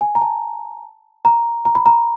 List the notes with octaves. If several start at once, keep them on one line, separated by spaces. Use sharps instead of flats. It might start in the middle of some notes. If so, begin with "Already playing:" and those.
G#5
A#5
A5
A#5
A#5
B5
A#5